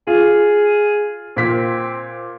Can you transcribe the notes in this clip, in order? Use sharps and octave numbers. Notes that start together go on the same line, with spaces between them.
F4 G#4
A#2 C4 B6